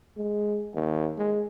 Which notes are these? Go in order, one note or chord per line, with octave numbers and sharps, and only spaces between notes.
G#3
D#2
G#3